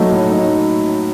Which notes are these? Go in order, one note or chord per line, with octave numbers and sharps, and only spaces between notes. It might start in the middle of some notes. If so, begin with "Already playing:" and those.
Already playing: F#3 A3 D#4
A2
D#4